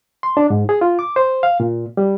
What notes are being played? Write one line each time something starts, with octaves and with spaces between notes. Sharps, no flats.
C6
D4
G#2
G#4
F4
D6
C5
F5
A#2
G3